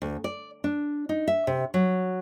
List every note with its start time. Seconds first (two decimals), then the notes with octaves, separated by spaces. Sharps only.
0.02 D2
0.24 D5
0.64 D4
1.09 D#4
1.28 E5
1.47 C3
1.74 F#3